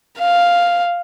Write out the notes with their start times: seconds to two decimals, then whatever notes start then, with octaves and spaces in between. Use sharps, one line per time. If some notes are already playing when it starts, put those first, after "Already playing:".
0.19 F5